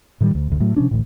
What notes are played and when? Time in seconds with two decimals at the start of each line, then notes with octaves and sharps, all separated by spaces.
0.21 A2 D#3 E3 G3
0.35 D2
0.48 F1 D2
0.60 A2 F#3
0.76 C3 F3 C#4 D4
0.91 A1 D2 A2